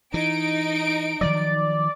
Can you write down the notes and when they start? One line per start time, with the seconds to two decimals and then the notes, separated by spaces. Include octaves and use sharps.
0.14 E3 D#4 D7
1.21 D#3 F3 F#3 D5